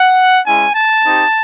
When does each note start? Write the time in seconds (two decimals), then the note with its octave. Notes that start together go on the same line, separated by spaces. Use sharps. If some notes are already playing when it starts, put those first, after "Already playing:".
Already playing: F#5
0.46 G#3 C#4 E4 G#5
0.75 A5
1.03 C4 D#4 G4